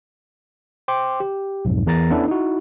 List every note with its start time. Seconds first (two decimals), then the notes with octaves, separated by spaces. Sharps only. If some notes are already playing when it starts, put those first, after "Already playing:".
0.88 C5 G5 C6 D6
1.20 G4
1.65 B1 F2 G#2
1.87 E2 A#4 A#5 A6 A#6
2.10 B3 C#4 D4 E4 A4
2.28 D#4 E4 F#4